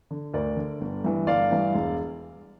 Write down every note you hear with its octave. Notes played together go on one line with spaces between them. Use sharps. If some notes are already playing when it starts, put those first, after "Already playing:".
D3
D2 A#4 D5
D3
G1
G2 E3
G1 D5 F5
G2 E3
E1